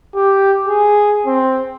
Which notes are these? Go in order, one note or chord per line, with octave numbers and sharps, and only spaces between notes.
G4
G#4
C4